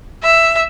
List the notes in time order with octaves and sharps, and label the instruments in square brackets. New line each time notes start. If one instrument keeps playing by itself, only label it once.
[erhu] E5